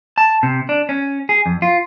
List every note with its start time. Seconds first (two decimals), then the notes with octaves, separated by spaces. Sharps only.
0.18 A5
0.43 C3
0.69 D4
0.89 C#4
1.29 G#4
1.46 F2
1.62 F4